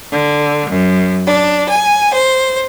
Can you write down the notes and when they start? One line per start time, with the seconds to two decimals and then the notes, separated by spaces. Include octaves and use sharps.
0.12 D3
0.70 F#2
1.26 D4
1.69 G#5
2.13 C5